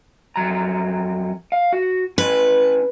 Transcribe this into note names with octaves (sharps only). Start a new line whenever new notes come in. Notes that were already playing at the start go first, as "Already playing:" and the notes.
F2 F#3 A#5
F5
F#4
C#4 E4 B4